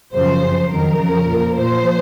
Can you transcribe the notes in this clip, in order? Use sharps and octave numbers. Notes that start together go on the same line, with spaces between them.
F#2 C#3 F3 C5
F#2 F3
F2 D#3 F#3 A#4
F2 C#3 F3
A#2 F3
A#2 F3 C5